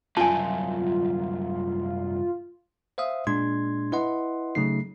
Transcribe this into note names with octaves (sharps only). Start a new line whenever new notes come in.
C2 F#2 F4 G#5 A5
C5 E5 F5 D#6
A#2 G#3 D4 C6 G#6
E4 B4 D#5 F#5 C6
C#3 F#3 A3 D#4 C7